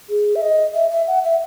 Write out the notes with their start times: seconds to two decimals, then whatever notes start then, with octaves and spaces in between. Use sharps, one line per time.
0.10 G#4
0.36 E5
0.42 D#5
0.74 E5
0.91 E5
1.08 F#5
1.24 E5